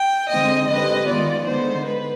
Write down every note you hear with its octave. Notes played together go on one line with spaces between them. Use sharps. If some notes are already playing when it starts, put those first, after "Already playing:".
Already playing: G5
D3 G#3 C4 D#4 D#5
D3 G#3 C4 G4 B4 D#5
D#3 G#3 B3 F4 D5
D3 G#3 B3 D#4 C5
B4